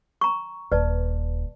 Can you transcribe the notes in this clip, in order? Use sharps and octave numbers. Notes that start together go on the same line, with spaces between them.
A#5 C#6
D#1 B4 D5 A5